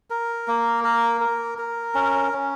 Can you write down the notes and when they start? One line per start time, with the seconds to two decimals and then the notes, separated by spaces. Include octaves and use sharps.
0.10 A#4
0.48 A#3
0.84 A#4
1.21 A#4
1.58 A#4
1.95 C#4
2.33 C#4